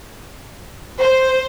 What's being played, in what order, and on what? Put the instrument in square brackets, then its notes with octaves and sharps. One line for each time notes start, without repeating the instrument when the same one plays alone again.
[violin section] C5